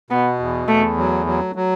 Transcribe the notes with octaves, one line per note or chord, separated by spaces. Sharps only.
B2 B3
E2
E2 A3
F#3
F#3
F#3